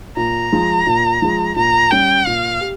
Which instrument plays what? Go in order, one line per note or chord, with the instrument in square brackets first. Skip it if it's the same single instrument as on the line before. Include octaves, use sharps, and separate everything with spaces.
[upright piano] A#2 [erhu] A#5
[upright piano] F3 G#3
A#2
F3 G#3
[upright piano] A#2 [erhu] A#5
[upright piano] G3 C#4 G4 [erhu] G5
[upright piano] A#2 [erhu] F5
[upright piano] G4